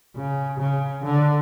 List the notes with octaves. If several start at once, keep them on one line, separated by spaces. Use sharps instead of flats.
C#3
C#3
D3